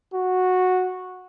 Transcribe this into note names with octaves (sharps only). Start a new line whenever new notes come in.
F#4